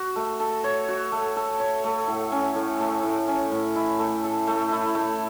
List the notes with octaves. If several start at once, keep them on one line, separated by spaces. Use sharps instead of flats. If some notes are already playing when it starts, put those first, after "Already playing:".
Already playing: F#4
A3
A4
C#5
F#4
A3
A4
C#5
A3
A2
C#4
A2
A3
A2
C#4
A2
E4
A3
A4
A3
E4
A3